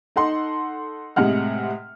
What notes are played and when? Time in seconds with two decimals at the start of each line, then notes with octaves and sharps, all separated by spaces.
0.16 D#4 A4 F#5 C6
1.16 A2 C3 G#3 F#5 F6